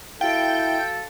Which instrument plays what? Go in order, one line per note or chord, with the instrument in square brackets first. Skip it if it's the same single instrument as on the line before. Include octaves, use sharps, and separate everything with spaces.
[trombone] E4 [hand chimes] F#4 F5 [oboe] A4 [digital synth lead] G5